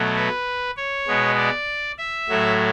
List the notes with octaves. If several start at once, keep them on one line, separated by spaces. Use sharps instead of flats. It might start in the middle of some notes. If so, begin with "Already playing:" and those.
Already playing: B2 F#3 A3
B4
C#5
B2 G#3 B3
D5
E5
A2 F#3 A3